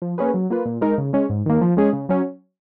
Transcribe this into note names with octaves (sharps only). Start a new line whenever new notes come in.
F3
A#3 C#4 G#4 B4
F#3
A#3 F4 B4
A#2
G#3 D#4 A#4
C#3
G#3 C#4
G#2
D#3 A#3
F3
G#3 C#4 G#4
C#3
F#3 C#4